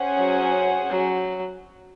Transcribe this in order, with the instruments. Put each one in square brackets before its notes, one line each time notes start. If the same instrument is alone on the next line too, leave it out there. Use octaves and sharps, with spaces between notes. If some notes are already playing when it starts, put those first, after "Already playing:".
Already playing: [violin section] C#4 G#4 C5 F#5
[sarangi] F#3
F#3